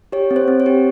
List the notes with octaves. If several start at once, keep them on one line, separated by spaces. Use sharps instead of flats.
G4 C#5
C4
C5
C4
C#5
G4